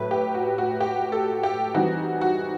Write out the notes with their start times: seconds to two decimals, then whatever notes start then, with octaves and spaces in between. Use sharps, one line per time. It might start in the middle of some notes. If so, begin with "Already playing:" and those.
Already playing: A2 F#3 A3 B4
0.11 G4
0.34 F#4
0.58 F#4
0.80 G4
1.12 A4
1.43 G4
1.74 E3 G3 C4 D#4 F#4
2.21 F#4